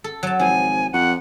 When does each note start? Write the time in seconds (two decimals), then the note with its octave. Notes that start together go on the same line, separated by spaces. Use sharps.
0.04 A4
0.23 F#3 A5
0.40 G#1 F3 G#5
0.93 F2 F#5